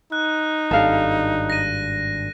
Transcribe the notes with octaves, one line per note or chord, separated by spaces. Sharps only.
D#4 F#6
G#1 G2 A4 F5
A#6 D#7